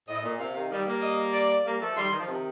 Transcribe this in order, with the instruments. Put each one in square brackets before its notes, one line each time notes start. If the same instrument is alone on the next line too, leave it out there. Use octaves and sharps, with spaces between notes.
[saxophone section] A2 [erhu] D#5
[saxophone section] A#2
[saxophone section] C3 [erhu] F5
[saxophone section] C3 D#3
D#3 G3
G3 A#3
[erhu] D#5
D5
[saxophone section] G3 A#3
F3 A3
[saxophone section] D#3 G3 [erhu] C6
[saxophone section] D#3
F3
C3 D#3